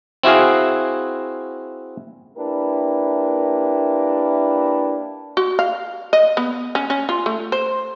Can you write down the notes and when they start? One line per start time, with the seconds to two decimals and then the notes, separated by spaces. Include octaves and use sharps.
0.23 C4 E4 F#4 G#4 F5
2.37 A#3 D4 E4 G4 A#4 B4
5.37 F#4
5.59 F5
6.13 D#5
6.37 B3
6.75 C#4
6.90 C#4
7.09 F4
7.26 A3
7.52 C5